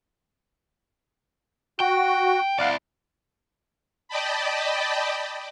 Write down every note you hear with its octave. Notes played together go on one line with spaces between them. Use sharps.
F#4 G5
E4 D5 F5 F#5
D5 D#5 G5 A5 B5